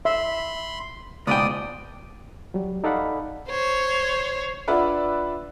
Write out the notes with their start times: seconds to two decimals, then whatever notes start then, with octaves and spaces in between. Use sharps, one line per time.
0.05 E5 B5 C6
1.27 C#2 G#2 B2 D5 G5 D#6
2.54 F#3 G3
2.84 D#4 A4 D5 F5 F#5 B5
3.50 C5 C#5
4.68 D4 F4 B4 D5 E5 F#5